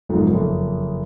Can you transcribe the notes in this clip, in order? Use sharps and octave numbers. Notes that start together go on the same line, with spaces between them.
F#1 B1 G#2 F3
F#1 F2